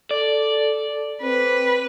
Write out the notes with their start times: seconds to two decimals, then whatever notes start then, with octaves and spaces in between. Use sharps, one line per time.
0.11 A4 D5
1.22 C4 B4